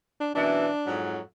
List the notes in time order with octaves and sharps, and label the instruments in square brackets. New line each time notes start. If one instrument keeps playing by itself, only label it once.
[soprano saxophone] D4
[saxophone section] F#2 B2 E3 [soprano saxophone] D4
[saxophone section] F2 G#2 F#3